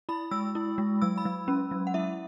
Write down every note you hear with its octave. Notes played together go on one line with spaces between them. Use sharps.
E4 B5
G#3 E6
E4
G#3
F#3 E6
B5
F#3
C#4
F#3
F#5
E4 E5